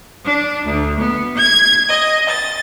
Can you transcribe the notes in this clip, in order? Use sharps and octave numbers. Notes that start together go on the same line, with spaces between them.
D4
D2
B3
G#6
D#5
A6